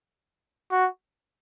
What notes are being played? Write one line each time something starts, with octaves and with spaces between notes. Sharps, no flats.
F#4